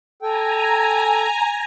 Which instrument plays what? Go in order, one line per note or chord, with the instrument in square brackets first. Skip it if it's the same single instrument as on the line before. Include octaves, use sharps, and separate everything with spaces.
[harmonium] A4 G5 [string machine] G#5 A#5